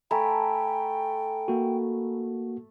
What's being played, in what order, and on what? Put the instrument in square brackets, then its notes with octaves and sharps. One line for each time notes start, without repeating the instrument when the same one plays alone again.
[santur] A3 [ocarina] G5 [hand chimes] G#5 A#5 B5
[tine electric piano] A#3 F#4